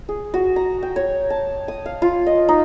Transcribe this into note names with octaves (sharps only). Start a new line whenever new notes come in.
G#4
F#4
A#5
G5
C#5
A5
D#6
F5
F4
D#5
D#4